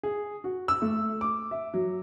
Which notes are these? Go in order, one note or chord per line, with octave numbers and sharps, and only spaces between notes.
G#4
F#4
E6
A3
D6
E5
F#3